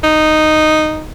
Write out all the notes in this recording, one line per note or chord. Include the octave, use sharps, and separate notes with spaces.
D#4